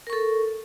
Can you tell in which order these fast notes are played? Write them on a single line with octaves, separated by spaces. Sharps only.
A#4 C#6 A4